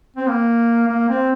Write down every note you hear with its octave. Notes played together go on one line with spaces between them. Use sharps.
C4
A#3
A#3
C4